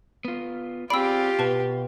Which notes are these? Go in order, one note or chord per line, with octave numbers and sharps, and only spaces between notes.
B3 F4
C4 F4 G4 G#4 D5 B5 E6
B2 B4 A5